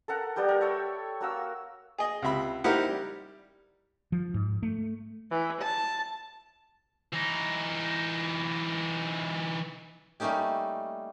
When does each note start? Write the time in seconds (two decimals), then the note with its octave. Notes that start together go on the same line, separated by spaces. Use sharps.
0.08 A4 A#4 F#5 A#5
0.36 G3 B3 G4 G5
0.48 A#4
0.61 A4 C#5 E5
1.21 A#3 F#4 A#4 E6
1.98 G#4 D#5
2.22 C#2 C3 E5 B5
2.64 D#4 E4 G4 A#4 C5 F#5
2.89 G3
4.12 F3
4.34 G#2
4.63 A3
5.31 E3
5.61 A5
7.13 E3 D#4
10.20 G3 A3 A#3 C#4 D#4 G4